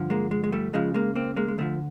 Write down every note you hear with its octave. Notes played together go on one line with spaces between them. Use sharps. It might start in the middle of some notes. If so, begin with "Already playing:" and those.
Already playing: G2 D3 F3
G#3 A#3
G#3
G#3
G3 A3
C#2 C#3 F3 G#3
G#3 A#3
A#3 C4
G#3 A#3
G#3
D2 D3 F3 G3 A3